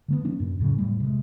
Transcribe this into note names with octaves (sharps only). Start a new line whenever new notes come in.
D3 A3 B3
F3 A#3 C#4 D4
F#2 B2
E2 A2 C#3 F#3
E1 A2 G3 A3
C3 G#3